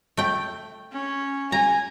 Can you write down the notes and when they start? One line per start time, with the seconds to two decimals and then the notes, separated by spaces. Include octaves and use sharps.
0.17 A3 G5
0.92 C#4
1.52 G#5 A#5